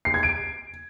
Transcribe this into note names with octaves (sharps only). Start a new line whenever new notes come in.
C7
G#6
D7